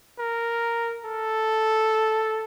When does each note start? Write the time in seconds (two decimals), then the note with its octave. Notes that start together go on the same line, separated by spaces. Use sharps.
0.18 A#4
1.04 A4